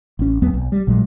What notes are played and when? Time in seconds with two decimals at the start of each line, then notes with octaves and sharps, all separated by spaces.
0.19 A1 C#4
0.42 D#2 F#3 B3 C4
0.53 B1
0.72 G3
0.87 A#1 A#2 F#3 G#3